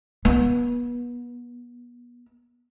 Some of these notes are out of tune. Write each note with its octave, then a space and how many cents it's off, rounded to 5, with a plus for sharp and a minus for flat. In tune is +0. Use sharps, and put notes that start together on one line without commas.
B3 -30